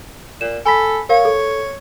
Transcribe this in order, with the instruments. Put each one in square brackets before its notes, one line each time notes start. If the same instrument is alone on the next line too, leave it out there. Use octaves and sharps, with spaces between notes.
[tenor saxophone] A#2 [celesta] E7
[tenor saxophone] A4 [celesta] G#5 B5 B6
[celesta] A#4 F5 [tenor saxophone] C#5
[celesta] A4